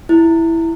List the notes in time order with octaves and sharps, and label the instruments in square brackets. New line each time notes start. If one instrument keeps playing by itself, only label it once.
[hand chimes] E4